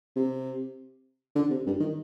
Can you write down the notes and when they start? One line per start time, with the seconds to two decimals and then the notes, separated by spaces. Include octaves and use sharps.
0.16 C3
1.36 D3
1.51 C3
1.66 G2
1.81 D#3